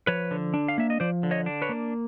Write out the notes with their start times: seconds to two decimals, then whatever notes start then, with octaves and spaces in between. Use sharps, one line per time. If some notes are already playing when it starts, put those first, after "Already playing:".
0.07 F3 B4 C#5
0.31 D3
0.54 D4
0.68 F5
0.78 A#3 E5
0.90 D#5
1.00 F3 C5 D5
1.23 D3
1.31 C#5 D#5
1.46 D4
1.62 B4 C#5
1.69 A#3